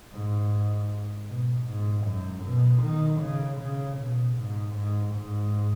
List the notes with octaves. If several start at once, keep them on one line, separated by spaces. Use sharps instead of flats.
G#2
B2
G#2
F#2
B2
D#3
C#3
C#3
B2
G#2
G#2
G#2